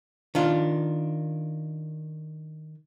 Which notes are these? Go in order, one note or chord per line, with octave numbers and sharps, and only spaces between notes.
D#3 D4 F4